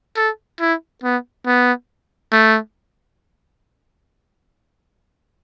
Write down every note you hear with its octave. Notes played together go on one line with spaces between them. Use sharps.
A4
E4
B3
B3
A3